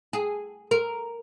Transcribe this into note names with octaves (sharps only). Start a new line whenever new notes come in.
G#4
A#4